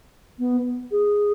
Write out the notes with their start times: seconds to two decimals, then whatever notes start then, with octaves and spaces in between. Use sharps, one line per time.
0.39 B3
0.91 G#4